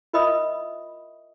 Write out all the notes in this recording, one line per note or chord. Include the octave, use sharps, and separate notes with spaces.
F4 A#4 D#5 E5 B5 D#6